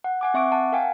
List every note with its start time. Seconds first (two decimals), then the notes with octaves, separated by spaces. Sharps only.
0.04 F#5
0.21 F#5 G#5 D6
0.34 C4 E5 C#6 D6 D7
0.52 F#5 A5
0.72 A#4 F5 G5 G#5